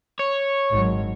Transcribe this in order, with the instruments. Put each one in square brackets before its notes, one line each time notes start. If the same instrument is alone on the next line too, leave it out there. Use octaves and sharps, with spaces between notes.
[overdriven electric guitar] C#5
[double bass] G#1 F#3